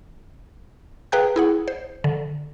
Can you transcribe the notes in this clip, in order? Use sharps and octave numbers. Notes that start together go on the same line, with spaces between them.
G#4 B4 F5 G5 A#5 F#6
E4 G#4 F#5
C5
D3